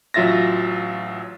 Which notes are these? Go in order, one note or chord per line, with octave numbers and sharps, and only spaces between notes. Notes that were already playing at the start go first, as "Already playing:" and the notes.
A1 F#3 F4 E5 A6 A#6